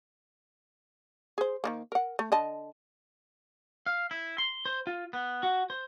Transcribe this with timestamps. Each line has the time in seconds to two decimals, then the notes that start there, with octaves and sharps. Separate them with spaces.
1.38 G#4 C5
1.64 D#3 E3 A#3
1.92 A#4 F#5
2.19 A3
2.32 D3 D#5 A5
3.86 F5
4.11 E4
4.38 C6
4.65 C5
4.87 F4
5.13 B3
5.43 F#4
5.70 C5